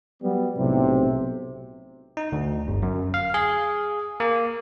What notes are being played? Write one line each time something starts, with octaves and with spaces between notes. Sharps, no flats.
F#3 G3 B3
B1 A2 C3
D#4
D2
G1
F#2
F5
G#4
A#3